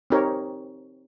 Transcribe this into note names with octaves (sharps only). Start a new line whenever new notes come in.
C4 D#4 G4 A#4 C#5